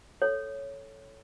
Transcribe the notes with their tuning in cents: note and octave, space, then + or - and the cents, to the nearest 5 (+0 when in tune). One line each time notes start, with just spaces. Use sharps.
A4 +0 C#5 +0